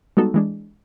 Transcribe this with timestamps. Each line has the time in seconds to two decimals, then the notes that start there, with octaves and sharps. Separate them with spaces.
0.17 G3 G#3 B3 D#4 F#4 A4
0.34 E3 G#3 D4